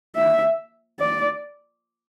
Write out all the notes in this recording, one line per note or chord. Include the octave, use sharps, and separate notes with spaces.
E5
D5